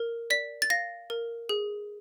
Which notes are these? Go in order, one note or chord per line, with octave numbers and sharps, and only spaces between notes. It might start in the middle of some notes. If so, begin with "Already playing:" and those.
Already playing: A#4
D5 B6
A6
F5 A#6
A#4
G#4